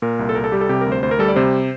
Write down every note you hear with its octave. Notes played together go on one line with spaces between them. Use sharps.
A#2 A#4
C2
A4
C2 A#4
A4
G3 G4
A4
C3 G4
A#4
D2
C5
D2 C5
A#4
G3 A4
D5
C3 C5